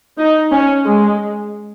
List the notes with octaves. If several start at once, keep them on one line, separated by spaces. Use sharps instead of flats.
D#4
C#4
G#3